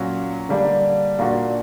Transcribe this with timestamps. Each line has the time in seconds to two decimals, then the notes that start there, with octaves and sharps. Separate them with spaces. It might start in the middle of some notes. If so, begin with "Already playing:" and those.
Already playing: A#2 F#3 C#4
0.49 D3 G3 A#3 D4
1.19 A#2 A#3 D4 F#4